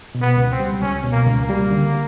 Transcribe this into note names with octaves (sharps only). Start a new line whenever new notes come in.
B2
B3
C#2
C4
G3
C#2 C#4
B2
A#3
C#2
A#3
G3
D3